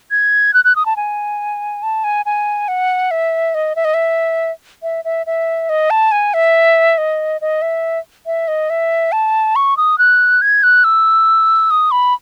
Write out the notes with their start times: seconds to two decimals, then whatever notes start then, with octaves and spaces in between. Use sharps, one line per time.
0.11 G#6
0.54 F#6
0.65 F#6
0.76 D#6
0.86 A5
0.96 G#5
1.83 A5
2.04 G#5
2.26 G#5
2.68 F#5
3.11 E5
3.54 D#5
3.76 E5
3.85 D#5
3.94 E5
4.83 E5
5.05 E5
5.26 E5
5.69 D#5
5.90 A5
6.12 G#5
6.34 E5
6.98 D#5
7.41 D#5
7.62 E5
8.26 E5
8.48 D#5
8.70 E5
9.12 A5
9.56 C#6
9.77 D#6
9.98 F#6
10.42 G#6
10.63 F#6
10.84 E6
11.71 D#6
11.91 B5